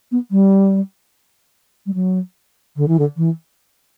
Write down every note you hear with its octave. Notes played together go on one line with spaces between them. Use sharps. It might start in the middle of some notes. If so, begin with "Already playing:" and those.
B3
G3
G3
F#3
D3
E3
D3
E3